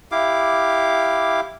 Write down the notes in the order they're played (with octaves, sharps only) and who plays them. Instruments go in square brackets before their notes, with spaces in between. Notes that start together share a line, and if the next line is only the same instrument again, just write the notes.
[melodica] E4 G4 F5 D6